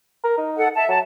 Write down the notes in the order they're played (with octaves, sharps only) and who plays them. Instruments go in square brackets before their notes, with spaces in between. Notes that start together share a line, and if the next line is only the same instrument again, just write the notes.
[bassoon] A#4
D#4
[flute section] A4 F#5
E5 A5
[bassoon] F#3 [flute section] A5